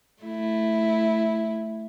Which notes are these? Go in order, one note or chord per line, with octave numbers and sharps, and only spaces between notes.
A3 E4